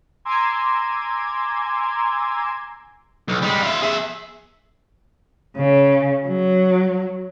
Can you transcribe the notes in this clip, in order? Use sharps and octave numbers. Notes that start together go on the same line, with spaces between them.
G#5 A#5 C6 D6 E6 G#6
B1
G3 G#3
F4 E5
G#4 E5
C#3
F#3